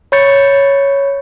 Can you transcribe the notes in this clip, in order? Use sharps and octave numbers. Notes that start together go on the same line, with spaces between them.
C#5 B5 C#6 G6 A6 C#7